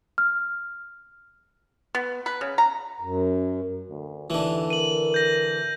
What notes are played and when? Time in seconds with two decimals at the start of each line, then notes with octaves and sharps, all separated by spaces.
0.18 F6
1.95 B3
2.26 B4
2.41 C#3
2.58 A#5
3.00 F#2
3.90 D2
4.30 D#2 D3 E3
4.70 A#4 D#7 F#7
5.14 G6 A#6